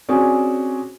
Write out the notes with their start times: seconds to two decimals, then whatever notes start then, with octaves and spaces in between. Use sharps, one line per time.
0.09 C4 C#4 F#4 G#4 D5